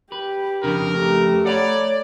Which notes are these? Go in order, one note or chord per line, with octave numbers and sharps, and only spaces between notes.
G4 B4
F2 C#3 D4 A#4 B4
A3 G4
C#5 D5 F#5 A#5 B5